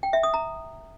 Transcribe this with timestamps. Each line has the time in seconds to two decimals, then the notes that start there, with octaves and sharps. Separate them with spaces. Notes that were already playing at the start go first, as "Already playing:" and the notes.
0.03 G5
0.13 E5
0.23 D#6
0.34 A#5